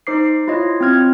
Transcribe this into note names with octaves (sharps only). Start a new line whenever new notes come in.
D#4 C5 D6 C7
E4 F4 C#5 D#5
C4 F4 F6 G#6